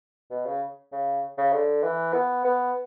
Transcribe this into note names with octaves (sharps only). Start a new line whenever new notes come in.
B2
C#3
C#3
C#3
D3
E3
B3
B3